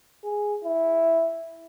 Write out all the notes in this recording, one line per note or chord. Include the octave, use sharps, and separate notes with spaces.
G#4
E4